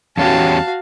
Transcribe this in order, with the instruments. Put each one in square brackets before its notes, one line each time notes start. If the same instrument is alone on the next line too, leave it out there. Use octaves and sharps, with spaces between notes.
[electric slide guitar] E2 C#4 G4 [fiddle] F#4 F5 [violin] A5